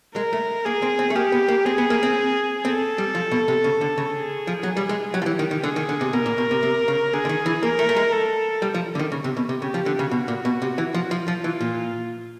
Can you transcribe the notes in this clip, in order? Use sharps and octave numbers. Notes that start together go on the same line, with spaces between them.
G#3 A#4
A3
A#3 G#4
C4
C4
A3
A#3 G4
B3
A#3
C4 G#4
B3
A#3
C4
C4 A4
G3
F3
B2
C3
C#3
D3
C#3
G#4
F3
F#3
G3
G#3
F#3 G4
F3
E3
D#3
D#3
D3 G#4
D#3
D3
C3
B2 A#4
A#2
B2
C3
C3
C#3
D3 G#4
D3
D#3
E3
A#3 A#4
A3
A3
G#3
A4
G3
F3
D3
D#3
C#3
C3
B2
C3
C#3 G4
F3
D3
C#3
B2 F#4
A#2
B2
C3
E3
F3
F3 F4
F3
E3
A#2